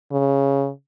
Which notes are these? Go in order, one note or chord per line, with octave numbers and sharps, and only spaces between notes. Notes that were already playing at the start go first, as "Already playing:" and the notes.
C#3